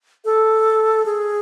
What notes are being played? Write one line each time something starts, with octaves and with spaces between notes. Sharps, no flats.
A4
G#4